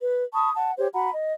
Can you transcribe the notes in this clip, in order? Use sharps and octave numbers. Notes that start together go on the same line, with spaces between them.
B4
A5 B5 C#6 D#6
F#5 A5
G4 C5 C#5
F#4 F#5 A#5 B5
D#5